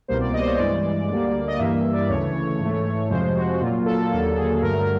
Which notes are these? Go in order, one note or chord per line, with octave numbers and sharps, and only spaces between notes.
C2 B2 G3 A#3 C5
D5
D#5
C5
C#5
G2 E3 G#3 D5
D2 D3 G3 A#3
D#5
G2 E3 G3 A#3 E5
D5
D2 C#3 E3 A3 C#5
G#2 E3 A3
F2 C3 F3 G#3 C5
F#4
F#4
A#2 F#3 A#3 F4
A4
D#2 D3 F#3 A#3 A4
G#4
G2 D3 F#3 A3 A#4